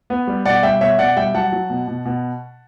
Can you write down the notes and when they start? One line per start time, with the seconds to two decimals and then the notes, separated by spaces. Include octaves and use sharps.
0.10 B3
0.27 G3
0.45 B2 D5 F#5
0.63 G3 E5 G5
0.81 B2 C#5 E5
0.99 B2 D5 F#5
1.17 G3 E5 G5
1.34 F#3 F#5 A5
1.52 F#3
1.70 B2
1.88 B2
2.05 B2